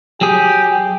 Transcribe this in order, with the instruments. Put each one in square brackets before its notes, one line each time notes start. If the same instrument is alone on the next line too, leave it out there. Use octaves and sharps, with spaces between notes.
[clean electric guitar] F#3 G#4 [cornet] G4